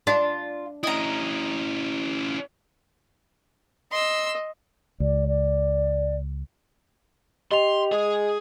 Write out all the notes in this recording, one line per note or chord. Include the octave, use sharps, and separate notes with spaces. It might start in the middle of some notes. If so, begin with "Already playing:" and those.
D4 F4
C#4 E4 D#5 A#5
D#5 C6 E6
C#2 D5
D5
G4 D#5 C6 F7
G#3 G#4